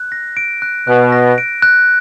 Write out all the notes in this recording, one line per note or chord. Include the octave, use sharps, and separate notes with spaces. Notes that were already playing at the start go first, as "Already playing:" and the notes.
Already playing: F#6
A#6
D7
F#6
B2 F#6
A#6
D7
F#6